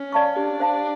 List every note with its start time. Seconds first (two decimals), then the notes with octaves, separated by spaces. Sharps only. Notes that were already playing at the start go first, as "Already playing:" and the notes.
Already playing: C#4
0.12 D5 F5 A5 C#6
0.36 D4 G4
0.60 C5 F5 A5 C6